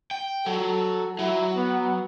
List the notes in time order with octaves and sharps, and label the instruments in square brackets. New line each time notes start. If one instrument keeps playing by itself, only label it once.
[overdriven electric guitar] G5
[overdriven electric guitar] F#3 [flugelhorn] A4
[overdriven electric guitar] F#3 [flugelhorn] E4
[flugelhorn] B3